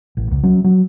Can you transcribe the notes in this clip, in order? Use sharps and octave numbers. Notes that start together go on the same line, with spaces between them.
A1
C#2
F#3 C#4
F#3